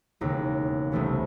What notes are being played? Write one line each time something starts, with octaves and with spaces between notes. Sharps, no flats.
E1 D#2 C#3
C2 C3 E3 A3 C#4